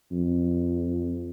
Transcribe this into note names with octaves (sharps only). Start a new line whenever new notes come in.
F2